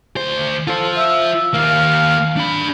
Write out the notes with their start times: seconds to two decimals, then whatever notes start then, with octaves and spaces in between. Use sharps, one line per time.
0.17 D2 C5
0.67 F4 A4 C5
0.97 E5
1.54 D#2 A#3 F5
2.37 D4 B5